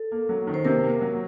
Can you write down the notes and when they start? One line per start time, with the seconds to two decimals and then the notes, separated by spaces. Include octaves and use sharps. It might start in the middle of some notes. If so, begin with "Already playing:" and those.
Already playing: A4
0.11 A#3
0.29 F#3
0.47 D#3
0.54 C5
0.65 C3 A#4
0.83 A#3
1.01 F#3